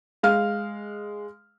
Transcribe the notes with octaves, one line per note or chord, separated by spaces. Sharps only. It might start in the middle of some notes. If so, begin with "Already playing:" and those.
G#3 F5 F6